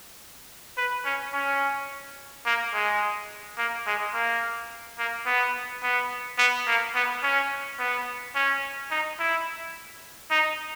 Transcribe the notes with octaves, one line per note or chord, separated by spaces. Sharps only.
B4
C#4
C#4
A#3
G#3
A#3
G#3
A#3
A#3
B3
B3
B3
A#3
B3
C#4
B3
C#4
D#4
E4
D#4